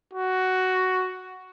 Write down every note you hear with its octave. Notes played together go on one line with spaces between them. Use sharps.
F#4